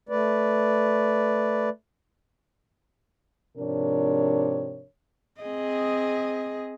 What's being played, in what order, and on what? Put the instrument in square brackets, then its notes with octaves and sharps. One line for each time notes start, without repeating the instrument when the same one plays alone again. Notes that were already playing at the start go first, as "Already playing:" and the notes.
[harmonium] A3 B4 D5
[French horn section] G#2 C3 F3 D4 A#4 C#5
[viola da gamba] C4 G#4 D#5